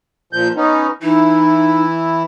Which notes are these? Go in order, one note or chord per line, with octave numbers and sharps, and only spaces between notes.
A#2 F3 G6
B3 C#4 D#4
E3 D#4 E4